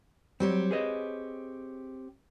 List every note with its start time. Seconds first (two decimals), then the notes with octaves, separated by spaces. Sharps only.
0.40 F#3 G3 C4 G4 C#5
0.71 G#4 B4 D#5